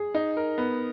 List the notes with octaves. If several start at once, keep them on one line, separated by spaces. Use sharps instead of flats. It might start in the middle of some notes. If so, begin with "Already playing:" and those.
Already playing: G#4
D#4
A#4
B3